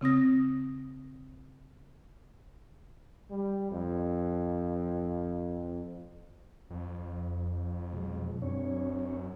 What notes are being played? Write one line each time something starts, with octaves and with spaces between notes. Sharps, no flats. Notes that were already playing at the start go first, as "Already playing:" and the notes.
C#3 C4 D#6 A#6
G3
F2
F2
B2 F#3 G#3
F#2 C4 D4 C#5